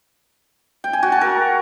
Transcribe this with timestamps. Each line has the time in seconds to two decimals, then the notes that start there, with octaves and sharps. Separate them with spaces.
0.84 G5
0.93 G#5
1.03 F#4
1.12 A5
1.21 A#4